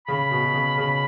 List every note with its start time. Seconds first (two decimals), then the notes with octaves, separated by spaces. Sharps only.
0.08 C#3 B5
0.31 B2
0.54 C#3
0.78 C#3